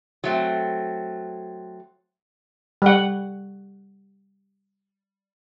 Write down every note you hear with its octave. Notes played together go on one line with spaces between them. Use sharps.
F#3 A3 C4
G3 F#5